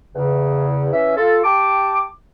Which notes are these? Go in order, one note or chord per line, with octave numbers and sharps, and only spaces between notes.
E2 C#3
E3 C#4 E5
F4 A4
G4 G5 A5 D6